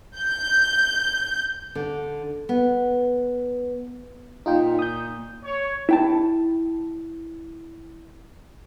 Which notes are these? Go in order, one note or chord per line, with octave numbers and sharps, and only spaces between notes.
G6
D3
B3
A#2 D#4 F4 G5
D#6 G6
C#5
E4 G5 A5